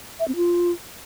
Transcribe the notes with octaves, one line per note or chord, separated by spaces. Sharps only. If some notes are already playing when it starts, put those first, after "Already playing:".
E5
C4
F4